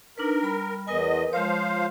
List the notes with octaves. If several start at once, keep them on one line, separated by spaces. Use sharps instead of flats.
D4 D#4 A#4 B4
G3 B5
E2 A#4 B4 D#5 G#5
F3 G#3 C5 C#5 F5